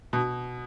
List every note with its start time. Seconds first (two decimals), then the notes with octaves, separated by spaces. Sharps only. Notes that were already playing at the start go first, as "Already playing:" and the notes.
0.13 B2